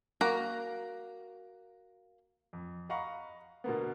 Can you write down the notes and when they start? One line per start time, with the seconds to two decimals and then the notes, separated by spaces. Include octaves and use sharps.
0.21 A#3 F#4 A#5
2.53 F2
2.89 D#5 F5 F#5 A#5 B5 C#6
3.64 B2 D3 A#3 B3